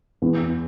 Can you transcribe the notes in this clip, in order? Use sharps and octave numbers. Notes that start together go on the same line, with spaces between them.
E2